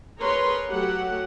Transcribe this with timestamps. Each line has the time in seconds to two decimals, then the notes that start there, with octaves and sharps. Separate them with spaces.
0.20 G#4 A#4 B4 C#5 A#5 C6
0.71 F#3 A3 G4 F#5